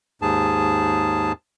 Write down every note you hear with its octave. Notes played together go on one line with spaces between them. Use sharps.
D#2 G#2 G#4 A5